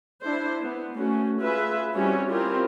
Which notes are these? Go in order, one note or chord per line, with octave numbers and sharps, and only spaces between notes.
D4 E4 C5
B3
A3 C#4 F#4
F4 G#4 B4 E5
G3 C4 C#4 E4 F#4 C#5
C4 E4 F4 G4 A#4